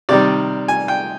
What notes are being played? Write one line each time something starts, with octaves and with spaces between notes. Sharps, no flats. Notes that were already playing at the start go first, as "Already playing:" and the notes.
C3 D#3 G3 D5
G#5
G5